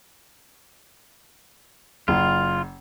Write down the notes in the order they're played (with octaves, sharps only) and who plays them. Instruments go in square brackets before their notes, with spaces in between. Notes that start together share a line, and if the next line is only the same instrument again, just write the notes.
[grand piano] F#1 [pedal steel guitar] F4